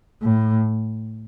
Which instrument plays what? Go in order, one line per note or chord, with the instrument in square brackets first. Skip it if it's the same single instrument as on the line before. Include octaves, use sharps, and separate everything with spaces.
[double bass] A2